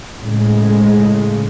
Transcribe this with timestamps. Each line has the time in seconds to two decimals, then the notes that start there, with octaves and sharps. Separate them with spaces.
0.20 A2 C#3 G#3